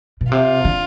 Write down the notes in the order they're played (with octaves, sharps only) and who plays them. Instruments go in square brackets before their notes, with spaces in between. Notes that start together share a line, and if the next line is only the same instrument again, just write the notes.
[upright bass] B2
[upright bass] C3 [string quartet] F4
[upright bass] D3